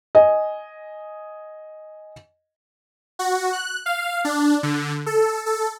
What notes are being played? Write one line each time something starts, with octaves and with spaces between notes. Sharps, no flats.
D#5 G#5
F#4
F#6
F5
D4
D3
A4
A4